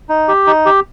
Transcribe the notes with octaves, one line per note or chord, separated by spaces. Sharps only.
D#4
G4
D#4
G4